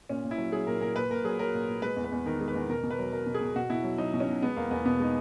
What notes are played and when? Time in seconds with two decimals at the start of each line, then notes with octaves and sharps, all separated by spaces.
0.09 A#2 C#4
0.24 A#2
0.31 E4
0.38 F#3
0.52 F#3 G#4
0.67 A#2 A#4
0.81 A#2 A#4
0.96 A#2 B4
1.11 A#2 A#4
1.25 F#3 G#4
1.39 F#3 A#4
1.54 A#2
1.68 A#2
1.82 G#3 B4
1.96 E2
2.04 B4
2.12 E2
2.26 D#3 A#4
2.40 G#3
2.48 B4
2.55 E2
2.69 B2 A#4
2.83 B2
2.91 B4
2.99 F#3
3.12 F#3 A#4
3.26 B2
3.35 G#4
3.41 B2
3.56 B2 F#4
3.70 B2 E4
3.84 F#3
3.98 F#3 D#4
4.14 B2
4.20 C#4
4.28 B2
4.42 G#3 B3
4.56 E2 A#3
4.71 E2 B3
4.85 B2 B3
4.99 G#3 D#4